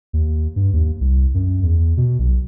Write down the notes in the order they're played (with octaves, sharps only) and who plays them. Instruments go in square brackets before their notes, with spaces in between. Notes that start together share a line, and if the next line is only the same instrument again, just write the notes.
[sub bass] D#2
G2
D#2
C2
F#2
E2
B2
B1